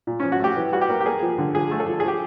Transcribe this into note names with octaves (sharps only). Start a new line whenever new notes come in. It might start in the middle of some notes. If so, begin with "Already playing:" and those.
A#2
F3 C#4
F#4
A3 G4
E3
G3 F#4
G4
A#3
G4
A#3 G#4
F3
D3
F3 G#4
A3
A4
F3
G#4
F3 G4